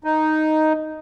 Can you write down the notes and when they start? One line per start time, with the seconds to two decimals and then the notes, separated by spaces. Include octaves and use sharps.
0.04 D#4